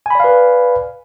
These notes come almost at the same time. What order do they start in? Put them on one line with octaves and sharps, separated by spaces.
G#5 B5 D5 F5 B4